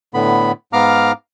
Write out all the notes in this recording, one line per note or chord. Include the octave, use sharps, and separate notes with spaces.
A2 D3 B3 B5
G#2 B3 F5 A#5 D6 F6